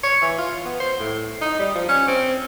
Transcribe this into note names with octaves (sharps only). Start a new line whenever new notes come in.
C#5
E3
F4
B3
C5
A2
D#4
G3
F3
C#4
C4